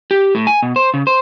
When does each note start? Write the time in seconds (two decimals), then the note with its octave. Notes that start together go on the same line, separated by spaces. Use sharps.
0.11 G4
0.35 A2
0.47 G#5
0.63 B2
0.76 C5
0.94 C#3
1.07 C5